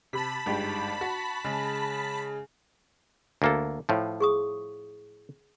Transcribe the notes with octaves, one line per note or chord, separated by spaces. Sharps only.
C3 A5 B5 B6
G1 G#2 G4
F#4
C#3 G#3
D2 A#3 A4
A2 F3
G#4 C#6 D#6